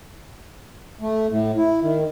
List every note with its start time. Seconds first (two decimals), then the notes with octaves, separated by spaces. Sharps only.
1.01 A3
1.30 A2
1.57 E4
1.82 D#3